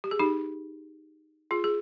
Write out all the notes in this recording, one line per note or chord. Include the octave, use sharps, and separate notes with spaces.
G4
G#4
D#4 G4
F4 G#4
G#4